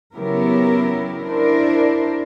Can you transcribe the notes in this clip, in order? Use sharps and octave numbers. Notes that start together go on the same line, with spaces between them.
C#3 F#3 B3 E4 G4 A#4
D4 E4 A#4 C5 D5